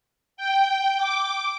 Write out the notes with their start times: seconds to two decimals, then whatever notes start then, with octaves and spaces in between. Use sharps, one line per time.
0.37 G5
0.98 D6